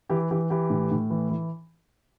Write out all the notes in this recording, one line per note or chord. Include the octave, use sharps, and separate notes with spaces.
E3 G4
E3 G4
E3 G4
A2
A2
E3
E3